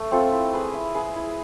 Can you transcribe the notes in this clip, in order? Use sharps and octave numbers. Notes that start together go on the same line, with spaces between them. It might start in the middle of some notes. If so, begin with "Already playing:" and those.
Already playing: A3
C4 F4 A4
E4
G#4 B4
E4
G#4 B4
E4